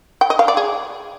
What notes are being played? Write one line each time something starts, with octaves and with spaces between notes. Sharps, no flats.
G5
D#5
F5
D5
G#4